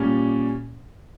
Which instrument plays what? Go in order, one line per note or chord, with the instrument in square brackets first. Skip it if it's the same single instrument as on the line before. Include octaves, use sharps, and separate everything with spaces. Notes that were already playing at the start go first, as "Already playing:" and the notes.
Already playing: [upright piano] A#2 G3 C#4